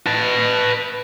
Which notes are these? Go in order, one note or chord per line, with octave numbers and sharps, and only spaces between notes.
B4 A5